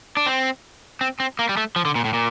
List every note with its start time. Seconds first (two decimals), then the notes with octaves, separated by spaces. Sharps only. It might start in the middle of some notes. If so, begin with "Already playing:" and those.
0.17 D4
0.26 C4
1.01 C4
1.20 C4
1.39 A#3
1.49 G3
1.57 A3
1.76 F3
1.85 D3
1.95 A#2
2.05 A2
2.13 A#2